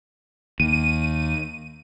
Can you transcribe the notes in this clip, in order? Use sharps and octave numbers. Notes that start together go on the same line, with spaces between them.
D#2 D#7